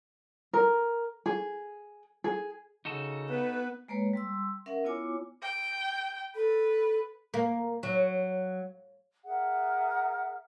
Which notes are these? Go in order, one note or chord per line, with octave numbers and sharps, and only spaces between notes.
A#4
G#4
G#4
C#3 D#4 F#4 A4
B3 B4
G#3 A#3 B4 C#5
G3 C6 E6
C#4 A#4 E5 F#5
B3 E4 F4 C#5 G#5 D6
G5
A4 B4
A#3
F#3
G#4 A#4 E5 F#5